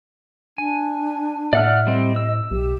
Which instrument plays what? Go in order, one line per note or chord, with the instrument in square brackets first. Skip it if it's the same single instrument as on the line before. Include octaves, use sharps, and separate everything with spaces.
[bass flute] D4 [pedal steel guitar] G#5
[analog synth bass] A2 [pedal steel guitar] D5 F#5 F6 [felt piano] E5
[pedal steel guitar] G3 C4 [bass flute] D#5
[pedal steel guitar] E6
[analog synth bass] B1 [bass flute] G4